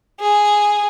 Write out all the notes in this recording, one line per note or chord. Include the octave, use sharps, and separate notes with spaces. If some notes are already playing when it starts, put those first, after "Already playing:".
G#4